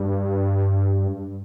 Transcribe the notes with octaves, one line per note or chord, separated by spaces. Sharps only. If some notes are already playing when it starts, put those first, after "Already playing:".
Already playing: G2